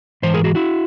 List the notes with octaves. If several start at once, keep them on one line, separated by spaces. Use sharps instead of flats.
G#2 E3 C5
G#4 A#4
F#4 G#4
E4 F#4